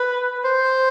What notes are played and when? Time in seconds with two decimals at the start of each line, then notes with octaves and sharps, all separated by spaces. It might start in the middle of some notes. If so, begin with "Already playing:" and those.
Already playing: B4
0.44 C5